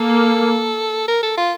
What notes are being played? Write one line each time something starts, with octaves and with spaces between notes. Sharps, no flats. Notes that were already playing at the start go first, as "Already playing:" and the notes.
Already playing: A#3 A4
A#4
A4
F4